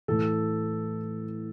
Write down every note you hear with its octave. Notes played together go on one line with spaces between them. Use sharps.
A2 E3 A4